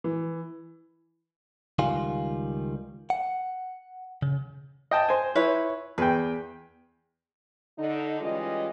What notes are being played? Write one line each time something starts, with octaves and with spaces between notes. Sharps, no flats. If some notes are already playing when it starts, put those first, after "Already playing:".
E3
C#2 D#3 G3 F4 G#5
F#5
C#3
D#5 G5 A5
C5 G#5
E4 B4 C#5
E2 B4 G5
D3 D#4
E3 G3 G#3 C#4 F4 D#5